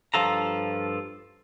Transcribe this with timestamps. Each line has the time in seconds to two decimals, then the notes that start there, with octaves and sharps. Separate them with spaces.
0.14 G2 F3 F4 A4 A#5